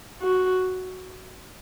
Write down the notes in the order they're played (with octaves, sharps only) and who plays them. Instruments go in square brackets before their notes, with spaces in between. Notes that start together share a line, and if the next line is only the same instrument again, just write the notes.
[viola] F#4